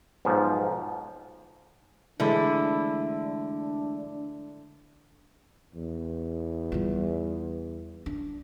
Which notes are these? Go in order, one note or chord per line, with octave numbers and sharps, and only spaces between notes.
B1 G#2 F3
D3 E3 G#3 A3 D4 E4
E2
G3 F4
D4